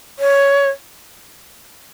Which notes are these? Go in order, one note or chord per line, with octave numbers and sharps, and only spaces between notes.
C#5